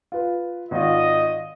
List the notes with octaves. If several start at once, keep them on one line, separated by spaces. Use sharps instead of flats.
F4 B4
G#1 F4 D#5